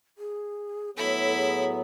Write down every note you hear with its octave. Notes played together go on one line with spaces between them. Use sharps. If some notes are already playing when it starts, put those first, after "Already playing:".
G#4
A2 F#3 B3 E4 A4 B5
G#4